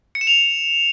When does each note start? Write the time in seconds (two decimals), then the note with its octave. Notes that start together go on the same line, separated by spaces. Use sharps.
0.15 C#7
0.21 E7
0.27 F7